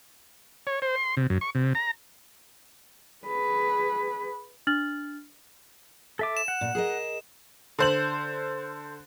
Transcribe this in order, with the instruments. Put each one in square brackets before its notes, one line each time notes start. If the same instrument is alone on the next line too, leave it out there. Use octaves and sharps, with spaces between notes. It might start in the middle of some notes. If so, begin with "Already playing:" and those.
[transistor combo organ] C#5
C5
C6
C3
F#2
C#6
C3
A#5
[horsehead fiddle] G#4 B4
[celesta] D4 F6 A6 F#7
[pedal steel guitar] A4 E5 D6
[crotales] E7
[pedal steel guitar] F#5
[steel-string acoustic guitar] A#2
G#4 A#4 D#5
[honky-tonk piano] D3 C5 F#7